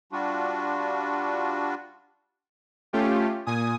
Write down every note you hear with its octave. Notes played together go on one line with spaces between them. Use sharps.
G3 D4 F4 F#4
A3 C#4 F4 G4
A#2 G#5 D#6